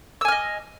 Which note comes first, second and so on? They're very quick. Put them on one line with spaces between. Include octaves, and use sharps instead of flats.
E6 G#5 F6 D#5